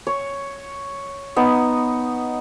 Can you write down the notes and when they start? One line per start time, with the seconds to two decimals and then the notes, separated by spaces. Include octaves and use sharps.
0.07 C#5
1.36 B3 D#4